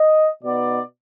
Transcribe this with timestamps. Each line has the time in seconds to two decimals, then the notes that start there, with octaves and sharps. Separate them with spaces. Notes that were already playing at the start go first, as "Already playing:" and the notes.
Already playing: D#5
0.44 B2 B3 D#4 D5